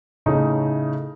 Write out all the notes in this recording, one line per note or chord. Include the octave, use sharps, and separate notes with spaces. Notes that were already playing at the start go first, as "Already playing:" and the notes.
A2 C#3 A3 D#4